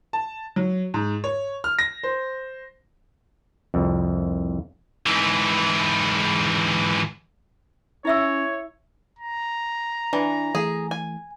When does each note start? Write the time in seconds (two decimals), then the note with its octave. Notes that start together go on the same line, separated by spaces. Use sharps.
0.13 A5
0.56 F#3
0.94 G#2
1.24 C#5
1.64 F6
1.79 A#6
2.03 C5
3.74 C2 F2
5.06 G#2 E3
8.05 C#4 E4 C#5 E5 E6
9.19 A#5
10.13 E3 D4
10.55 E3 A3 G#4
10.91 G#5